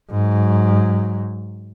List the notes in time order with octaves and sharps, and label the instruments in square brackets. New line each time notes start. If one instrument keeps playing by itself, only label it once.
[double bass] G#2 F#3